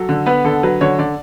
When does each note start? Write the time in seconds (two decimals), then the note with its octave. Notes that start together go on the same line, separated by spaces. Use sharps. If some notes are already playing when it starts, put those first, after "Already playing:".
Already playing: F#3 A4
0.09 D3
0.26 B3 B4
0.45 D3 A4
0.63 F#3 B4
0.81 D3 C#5
0.99 D3 D5